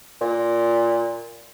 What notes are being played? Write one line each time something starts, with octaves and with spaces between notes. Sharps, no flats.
A#2